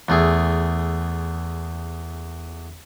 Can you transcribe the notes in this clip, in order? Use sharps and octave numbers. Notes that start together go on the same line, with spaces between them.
E2 A3 G#4